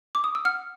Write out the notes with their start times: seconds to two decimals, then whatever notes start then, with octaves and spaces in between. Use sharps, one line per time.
0.15 D6
0.24 D#6
0.35 E6
0.45 F#5 F6